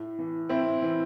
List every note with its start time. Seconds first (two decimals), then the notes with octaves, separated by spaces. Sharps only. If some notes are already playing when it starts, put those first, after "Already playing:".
Already playing: A2
0.19 E3
0.49 A2 C4 E4
0.82 E3